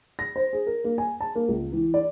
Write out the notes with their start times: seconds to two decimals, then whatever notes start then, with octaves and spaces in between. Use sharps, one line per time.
0.19 A#6
0.36 C5
0.53 G#4
0.67 A#4
0.84 A#3
0.98 G#5
1.21 A5
1.36 A#3
1.48 C#2
1.73 E3
1.94 D5